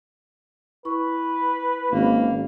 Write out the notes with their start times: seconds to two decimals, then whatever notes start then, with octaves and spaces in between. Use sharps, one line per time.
0.85 E4 B4 C#6
1.92 G#1 A#3 C#4